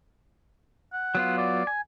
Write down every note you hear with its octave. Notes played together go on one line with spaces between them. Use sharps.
F#5
F#3 B3 F4
D5
G#5